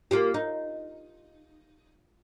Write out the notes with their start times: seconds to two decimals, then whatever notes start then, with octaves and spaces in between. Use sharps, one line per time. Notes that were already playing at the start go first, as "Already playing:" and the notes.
0.11 A#3 F4 G4
0.34 D#4